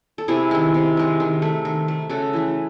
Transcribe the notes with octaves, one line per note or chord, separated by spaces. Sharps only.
A4
C3 E4 G#4
D#3 G#3
C3
D#3 G#3
D#3
A3
D#3
A3
C#3 F#4 A4
E3 A3